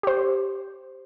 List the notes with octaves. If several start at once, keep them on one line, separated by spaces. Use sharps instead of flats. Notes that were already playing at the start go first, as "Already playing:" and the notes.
G4 C5